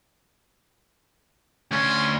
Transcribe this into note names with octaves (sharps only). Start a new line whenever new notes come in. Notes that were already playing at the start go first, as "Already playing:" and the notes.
D2 C#4 C6